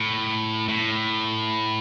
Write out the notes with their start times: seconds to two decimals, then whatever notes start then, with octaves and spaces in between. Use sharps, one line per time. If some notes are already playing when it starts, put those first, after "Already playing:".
Already playing: A2
0.69 A2